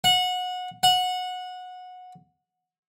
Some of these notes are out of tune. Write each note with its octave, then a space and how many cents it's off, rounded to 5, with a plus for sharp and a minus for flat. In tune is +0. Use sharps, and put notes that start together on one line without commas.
F#5 -25
F#5 -20